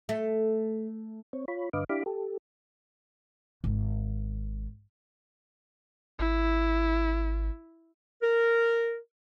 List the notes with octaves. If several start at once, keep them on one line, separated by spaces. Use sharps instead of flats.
A3
C4 C#5
F4 C#5 B5
G2 D3 B4 D#5 F5 D6
D4 E4 G4 F5 B5 D6
G4 A4
G#1
G#1 E4
A#4